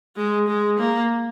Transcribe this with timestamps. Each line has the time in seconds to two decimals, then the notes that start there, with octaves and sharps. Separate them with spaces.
0.17 G#3
0.48 G#3
0.79 A#3